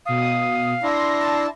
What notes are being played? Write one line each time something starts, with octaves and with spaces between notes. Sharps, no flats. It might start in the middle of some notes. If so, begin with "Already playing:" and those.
B2 F5 D#6
D4 E4 C6 A#6
A5